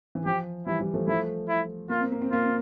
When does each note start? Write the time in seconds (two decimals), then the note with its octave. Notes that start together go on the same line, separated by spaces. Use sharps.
0.15 E3
0.26 F3 G4
0.67 E3 G3 E4
0.80 E3 G3
0.94 F3 A3
1.08 F3 A3 E4
1.49 E4
1.89 A#3 F4
2.01 C4
2.12 A#3
2.22 C4
2.31 A#3 F4
2.44 C4